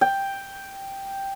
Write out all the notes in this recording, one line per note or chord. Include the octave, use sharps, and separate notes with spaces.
G5